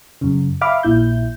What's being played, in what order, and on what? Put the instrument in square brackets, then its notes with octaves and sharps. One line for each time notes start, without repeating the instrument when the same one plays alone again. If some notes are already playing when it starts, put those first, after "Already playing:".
[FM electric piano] F#2 C#3
E5 F5 B5 D6 F6
A#1 A#2 E4 G6